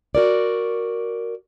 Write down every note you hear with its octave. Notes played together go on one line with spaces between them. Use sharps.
F#4 A#4 D5